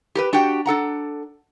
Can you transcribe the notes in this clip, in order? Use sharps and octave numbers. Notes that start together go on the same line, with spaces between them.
G4 A#4 B4
D4 F#4 G4 F#5 G5
D4 A4 F#5 A#5